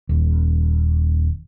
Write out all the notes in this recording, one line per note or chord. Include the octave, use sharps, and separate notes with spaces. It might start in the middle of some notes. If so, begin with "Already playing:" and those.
D#1